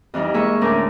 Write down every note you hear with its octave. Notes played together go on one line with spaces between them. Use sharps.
F2 E3 G3 D#4
G#3 A#3 G#4 E5 C#6
D2 A2 C#4 A#4 D6